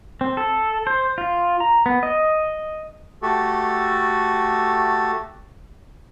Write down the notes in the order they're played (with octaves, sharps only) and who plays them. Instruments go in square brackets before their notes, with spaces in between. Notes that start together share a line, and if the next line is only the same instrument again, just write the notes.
[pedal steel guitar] C4
A4
C5
F4
A#5
B3
D#5
[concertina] A3 F#4 G4 A4